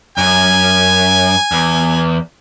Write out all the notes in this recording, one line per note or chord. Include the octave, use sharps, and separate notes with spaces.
F#2 G#5
E2